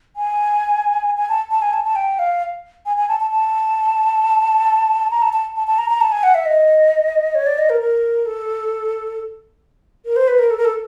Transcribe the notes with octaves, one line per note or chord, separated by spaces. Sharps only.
G#5
G#5
A5
A5
G#5
A5
A5
G5
F5
G#5
G#5
A5
A5
A5
A#5
A5
A5
A5
A5
A#5
A#5
A5
G#5
F#5
E5
D#5
C#5
D5
D#5
A#4
A#4
A4
A#4
C5
B4
A#4
A4
A#4
A4